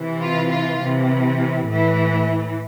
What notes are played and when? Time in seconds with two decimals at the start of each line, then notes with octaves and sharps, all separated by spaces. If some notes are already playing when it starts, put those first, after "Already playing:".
Already playing: C3 E3
0.21 F4
0.50 F4
0.79 C3 E3
1.67 A2 E3